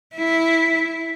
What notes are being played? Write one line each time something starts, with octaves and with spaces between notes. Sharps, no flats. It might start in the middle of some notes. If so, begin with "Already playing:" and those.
E4